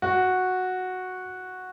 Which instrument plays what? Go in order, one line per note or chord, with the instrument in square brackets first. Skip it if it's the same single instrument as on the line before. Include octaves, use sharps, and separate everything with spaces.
[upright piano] F#4